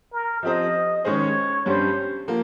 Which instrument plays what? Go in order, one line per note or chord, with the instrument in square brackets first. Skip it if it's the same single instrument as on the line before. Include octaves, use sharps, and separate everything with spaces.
[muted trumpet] A#4
[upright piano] F3 C4 G4 C5 [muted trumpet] D#5
[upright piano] D#3 G#3 C#4 G#4 C5 [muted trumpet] C#5
[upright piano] G2 G3 C#4 G4 [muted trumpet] C5
[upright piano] F3 A#3